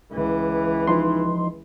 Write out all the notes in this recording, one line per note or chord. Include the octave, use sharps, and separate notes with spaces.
C#2 E3
F3 D#4 C6